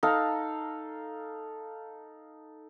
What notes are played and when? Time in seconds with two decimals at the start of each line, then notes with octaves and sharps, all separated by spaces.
0.03 D#4 A4 F5 A#5